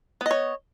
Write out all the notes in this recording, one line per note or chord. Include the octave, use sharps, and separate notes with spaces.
B3 C#5 D#5